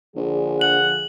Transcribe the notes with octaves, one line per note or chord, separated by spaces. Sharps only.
A#1 D3 F3 G#4
F#5 F#7